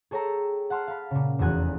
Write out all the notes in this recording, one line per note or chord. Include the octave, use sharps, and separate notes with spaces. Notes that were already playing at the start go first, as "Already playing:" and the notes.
G#4 A4 C#5 G5 A#5 E6
F#5 A5 C6 F6
F5 B5
A#2 C#3
F1 E2 F#4 G#5 F#6